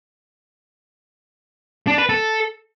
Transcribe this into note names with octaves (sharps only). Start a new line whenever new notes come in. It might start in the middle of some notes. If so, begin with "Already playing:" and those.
D4
B4
A4